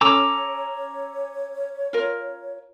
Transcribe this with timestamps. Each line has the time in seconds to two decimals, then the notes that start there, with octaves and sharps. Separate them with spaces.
0.01 C#4 A4 C#5 A#5 D6 E6
1.93 F4 A#4